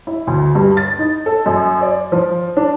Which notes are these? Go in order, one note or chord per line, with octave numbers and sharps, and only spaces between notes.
E4
D2
G2
A6
D#4
A4
F#2
D5
F3
D4